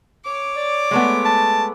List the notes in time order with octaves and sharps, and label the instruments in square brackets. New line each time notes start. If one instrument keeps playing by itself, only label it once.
[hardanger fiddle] C#5 D6
[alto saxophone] D5
[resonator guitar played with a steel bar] G#3 A3 B3
[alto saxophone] A5